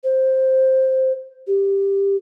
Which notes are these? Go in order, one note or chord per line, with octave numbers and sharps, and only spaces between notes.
C5
G4